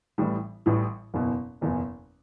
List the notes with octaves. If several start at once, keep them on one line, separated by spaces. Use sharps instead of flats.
A1 A2 E3 G3
A1 A2 E3 G3
F#1 E2 B2
F#1 E2 B2